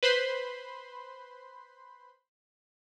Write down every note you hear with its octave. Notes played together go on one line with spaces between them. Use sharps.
B4 C5 B5 C6